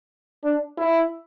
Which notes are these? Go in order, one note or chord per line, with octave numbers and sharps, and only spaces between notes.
D4
E4